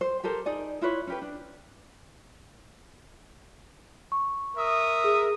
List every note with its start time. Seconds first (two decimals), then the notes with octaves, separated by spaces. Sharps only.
0.01 C5
0.24 G4 A4 A#4 C5
0.46 D#4 G#4 D5
0.81 E4 F4 B4 C#5
1.07 C#4 G4 B4
1.22 D4
4.12 C#6
4.56 A#4 E5 D#6
5.04 G#4